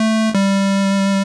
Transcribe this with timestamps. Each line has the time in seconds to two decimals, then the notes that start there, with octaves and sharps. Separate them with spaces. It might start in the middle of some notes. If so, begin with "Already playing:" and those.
Already playing: A3
0.35 G3